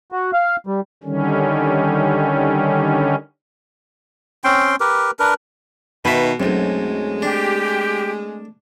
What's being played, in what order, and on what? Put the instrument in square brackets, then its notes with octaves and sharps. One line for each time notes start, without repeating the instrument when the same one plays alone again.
[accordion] F#4
F5
G3
[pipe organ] D3 D#3 G3 C#4
[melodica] C4 C#4 G5 C6
G4 A#4 B4
D4 A#4 B4
[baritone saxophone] B2 [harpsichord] D#3 E5 [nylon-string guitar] D#4 B4
[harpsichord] B1 F#2 [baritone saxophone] G#3 [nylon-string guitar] A3 C4
[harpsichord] D4 [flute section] G4